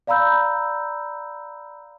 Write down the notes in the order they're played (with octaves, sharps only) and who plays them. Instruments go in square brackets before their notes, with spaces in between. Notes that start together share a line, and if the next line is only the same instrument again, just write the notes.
[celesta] D5 F5 A#5 B5 E6 G6